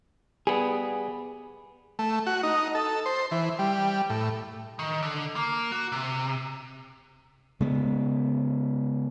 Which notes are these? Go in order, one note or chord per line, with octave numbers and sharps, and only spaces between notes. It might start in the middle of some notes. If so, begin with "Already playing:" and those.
G3 B3 G#4
A3
F#4
D#4
A4
C5
E3
G3
A2
D#3
D3
A#3
F#4
C3
C#3 G#3 B3